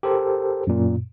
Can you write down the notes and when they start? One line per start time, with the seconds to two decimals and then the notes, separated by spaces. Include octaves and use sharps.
0.03 G4 A4 A#4 C5
0.67 F#2 A#2